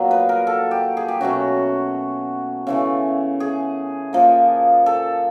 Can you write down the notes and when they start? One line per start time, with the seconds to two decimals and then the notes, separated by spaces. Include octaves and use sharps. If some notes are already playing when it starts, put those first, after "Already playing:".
Already playing: A#2 F#3 B3
0.11 B4
0.29 A#4
0.47 A4
0.71 G4
0.97 G#4
1.08 G4
1.21 B2 F#3 A3 C#4 F#4
2.67 C#3 E3 A3
3.40 G#4
4.13 A#2 F3 A#3
4.86 A4